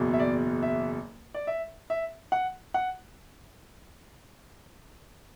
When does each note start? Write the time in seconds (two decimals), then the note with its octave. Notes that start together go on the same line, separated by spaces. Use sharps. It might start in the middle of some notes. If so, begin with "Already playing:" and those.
Already playing: F#1 E2 B2
0.13 E5
0.20 D5
0.62 E5
1.35 D5
1.47 E5
1.90 E5
2.32 F#5
2.74 F#5